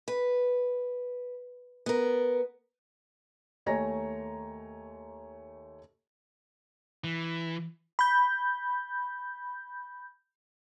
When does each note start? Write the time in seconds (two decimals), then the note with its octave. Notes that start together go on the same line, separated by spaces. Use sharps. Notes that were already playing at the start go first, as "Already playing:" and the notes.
0.08 B4
1.86 B3 A#4
3.66 D#2 A3 C#5 G#5 A#5 A#6
7.04 E3
7.99 B5 G6